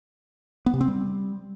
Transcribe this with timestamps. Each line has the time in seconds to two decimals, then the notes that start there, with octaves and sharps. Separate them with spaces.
0.66 B3
0.74 C3
0.81 C4
0.88 G3